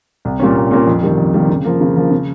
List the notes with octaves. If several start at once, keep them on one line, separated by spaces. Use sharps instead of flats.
C2
A#2 G3 A#3 C#4
C2
A#2 G3 A#3 C#4
F2
C3 D#3 G3 A#3
F2
C3 D#3 G3 A#3
C#3
F3 A#3
C#3
F3 A#3
C#3